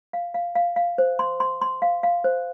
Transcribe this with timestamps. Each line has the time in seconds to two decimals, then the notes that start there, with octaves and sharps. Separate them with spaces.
0.13 F5
0.34 F5
0.55 F5
0.76 F5
0.98 C5
1.19 C6
1.40 C6
1.61 C6
1.82 F5
2.03 F5
2.24 C5